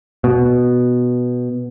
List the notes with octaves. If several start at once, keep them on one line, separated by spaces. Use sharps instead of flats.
B2